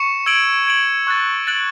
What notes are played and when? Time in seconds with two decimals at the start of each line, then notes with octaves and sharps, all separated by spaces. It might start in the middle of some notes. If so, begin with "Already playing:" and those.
Already playing: C#6 C#7 E7
0.26 E6 G#6 D7 F#7
0.67 G#6 D7 F#7
1.07 C#6 F#6 A6
1.47 F#6 A6 D7 F#7